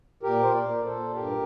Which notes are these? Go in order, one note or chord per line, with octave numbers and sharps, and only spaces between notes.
A#2 G4 A#4
A#2 C5
A#4 D5
A#2
A4 C5
A#2
G2 G4 A#4